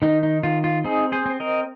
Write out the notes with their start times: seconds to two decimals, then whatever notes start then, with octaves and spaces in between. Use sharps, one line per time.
0.02 D#3 D#4
0.23 D#4
0.43 D#3 F4
0.64 F4
0.84 C4 D#4 G#4
1.12 G#4 C5
1.26 C4
1.40 A#4 D#5